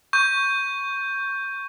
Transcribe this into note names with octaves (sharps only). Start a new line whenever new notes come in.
C#6 G6